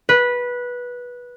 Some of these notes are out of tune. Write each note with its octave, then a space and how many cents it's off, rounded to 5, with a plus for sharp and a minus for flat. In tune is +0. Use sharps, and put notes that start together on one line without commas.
B4 -15